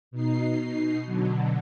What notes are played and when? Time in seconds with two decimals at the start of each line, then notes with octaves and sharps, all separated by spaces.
0.11 B2 D#4 C7
1.06 B2 D3 F#3